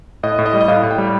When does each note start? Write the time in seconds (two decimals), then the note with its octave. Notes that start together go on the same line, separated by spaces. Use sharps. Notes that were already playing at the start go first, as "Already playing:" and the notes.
0.23 A2 D#5
0.39 A2
0.46 D#5
0.53 G3
0.61 D#5
0.68 A2 F5
0.83 A2
0.91 G5
0.98 G3